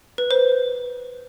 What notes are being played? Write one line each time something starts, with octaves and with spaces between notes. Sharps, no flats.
B4
C5